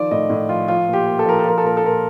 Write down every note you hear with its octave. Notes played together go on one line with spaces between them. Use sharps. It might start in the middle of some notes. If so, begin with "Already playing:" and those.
Already playing: D#3 F3 D5
A2 D#5
A2
F3 F4
F3 F4
A#2
G4
A#2
A4
F3 A#4
A4
F3 A#4
A4
A#2 A#4
A4
A#2 A#4